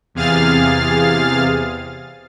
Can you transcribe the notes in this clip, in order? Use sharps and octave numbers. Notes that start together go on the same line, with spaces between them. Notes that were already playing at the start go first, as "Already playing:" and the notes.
E2 C3 G#4 F5 F6 A6